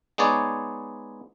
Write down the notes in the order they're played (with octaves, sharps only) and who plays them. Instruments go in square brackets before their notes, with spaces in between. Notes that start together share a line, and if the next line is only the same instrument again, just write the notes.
[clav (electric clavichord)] G#3 B3 D#4 G#4 C#5 D5